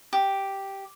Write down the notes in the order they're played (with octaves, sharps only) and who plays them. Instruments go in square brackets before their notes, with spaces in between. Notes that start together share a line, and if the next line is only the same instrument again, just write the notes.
[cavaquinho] G4